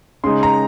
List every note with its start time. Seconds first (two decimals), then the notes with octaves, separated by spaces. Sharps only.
0.24 C#3 G#3 D#4 C6
0.43 A#5